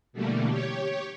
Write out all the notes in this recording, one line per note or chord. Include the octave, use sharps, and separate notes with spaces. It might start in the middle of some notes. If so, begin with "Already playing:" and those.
B2 D3 E3 G3 A3 A#3
G4 C#5